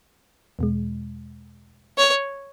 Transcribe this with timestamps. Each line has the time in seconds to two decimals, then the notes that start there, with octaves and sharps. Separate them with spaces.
0.59 E2 B2 G#3
1.98 C#5